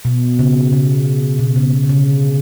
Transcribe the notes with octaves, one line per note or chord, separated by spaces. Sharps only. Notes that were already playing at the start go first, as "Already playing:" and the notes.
B2
C#3
C#3
B2
C#3
B2
D3
C#3